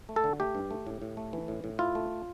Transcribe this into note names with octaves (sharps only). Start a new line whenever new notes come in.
A3
A4
D3
A3 G4
G2
A3
A2
A2
A3
E3
A2
A2
E4 F4
A3